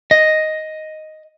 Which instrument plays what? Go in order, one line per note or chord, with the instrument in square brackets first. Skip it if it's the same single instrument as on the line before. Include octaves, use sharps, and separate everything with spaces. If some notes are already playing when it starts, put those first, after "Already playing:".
[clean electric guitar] D#5